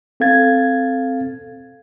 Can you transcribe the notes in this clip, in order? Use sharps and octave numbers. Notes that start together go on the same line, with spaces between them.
C4 A4 F5 G#6 A6